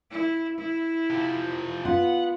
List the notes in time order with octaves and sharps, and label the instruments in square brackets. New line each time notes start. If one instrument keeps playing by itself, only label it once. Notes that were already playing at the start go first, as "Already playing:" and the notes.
[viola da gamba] E4
E4
[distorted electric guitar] C3 F3
[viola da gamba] B3 [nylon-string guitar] F4 [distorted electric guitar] F#5